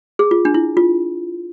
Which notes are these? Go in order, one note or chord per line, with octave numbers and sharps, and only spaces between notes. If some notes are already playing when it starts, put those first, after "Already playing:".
G#4
F4
D4
E4
F4